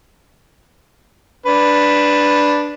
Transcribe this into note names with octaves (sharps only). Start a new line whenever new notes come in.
D4 B4